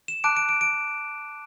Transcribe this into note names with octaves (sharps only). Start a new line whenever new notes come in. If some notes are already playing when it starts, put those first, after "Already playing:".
E7
A5 D6 F#6 D7
D7
D7
D7